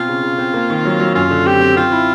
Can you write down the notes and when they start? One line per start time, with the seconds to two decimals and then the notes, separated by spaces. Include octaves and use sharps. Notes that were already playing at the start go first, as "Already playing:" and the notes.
Already playing: B2 C4 F4
0.08 C#3
0.23 C#3
0.38 C4
0.54 A#3
0.70 D#3
0.85 F#3
1.00 F#3
1.15 F#2 F4
1.31 D3
1.46 C4 G4
1.61 C4
1.77 C4 F4
1.92 E4